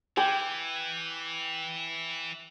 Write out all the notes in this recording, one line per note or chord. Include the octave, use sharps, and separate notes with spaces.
E3 G5 G#5 D6